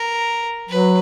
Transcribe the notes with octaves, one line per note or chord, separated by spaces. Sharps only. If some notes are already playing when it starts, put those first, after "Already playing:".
Already playing: A#4
F#3 B4